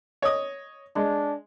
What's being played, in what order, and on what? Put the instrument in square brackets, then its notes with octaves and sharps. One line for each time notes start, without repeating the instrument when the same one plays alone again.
[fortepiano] C#5 D#5 D#6
[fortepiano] G#3 [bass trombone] D4